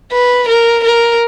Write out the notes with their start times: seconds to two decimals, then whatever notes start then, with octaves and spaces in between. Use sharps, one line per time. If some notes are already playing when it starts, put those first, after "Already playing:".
0.13 B4
0.49 A#4
0.84 A#4